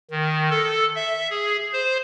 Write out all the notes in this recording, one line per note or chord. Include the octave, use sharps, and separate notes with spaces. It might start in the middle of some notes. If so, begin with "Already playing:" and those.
D#3
A4
E5
G#4
C5